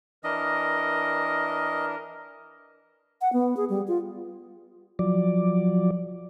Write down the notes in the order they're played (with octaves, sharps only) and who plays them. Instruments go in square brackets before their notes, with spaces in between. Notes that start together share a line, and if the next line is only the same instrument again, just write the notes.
[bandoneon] E3 D4 [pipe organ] A#4 [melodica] D#5
[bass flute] F#5
B3
G#4
G3
F4
[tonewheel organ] F3 F#3 D5